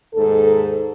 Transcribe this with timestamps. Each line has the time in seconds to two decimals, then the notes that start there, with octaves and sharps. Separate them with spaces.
0.14 D#2 G#2 A4